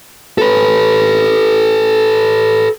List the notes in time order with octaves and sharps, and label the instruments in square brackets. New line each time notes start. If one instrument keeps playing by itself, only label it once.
[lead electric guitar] A4 B4